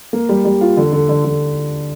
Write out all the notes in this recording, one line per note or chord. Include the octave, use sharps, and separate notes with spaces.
A#3
G3
G3
F4
D3
D3
D3
D3